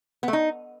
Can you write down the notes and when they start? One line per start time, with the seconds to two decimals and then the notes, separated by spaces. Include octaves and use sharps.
0.23 B3
0.28 A3
0.33 D#4